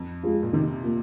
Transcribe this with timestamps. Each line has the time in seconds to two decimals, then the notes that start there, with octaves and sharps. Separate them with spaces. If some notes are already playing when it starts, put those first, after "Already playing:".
Already playing: F2
0.23 G#3 F4
0.43 A#2
0.53 C3 D#3
0.83 A#3 F4